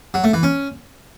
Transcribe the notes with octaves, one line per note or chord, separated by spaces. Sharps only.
F#3
A3
E3
C#4